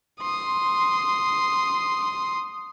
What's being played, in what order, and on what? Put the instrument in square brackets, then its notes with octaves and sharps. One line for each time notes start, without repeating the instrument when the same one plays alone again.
[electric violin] C6 D#6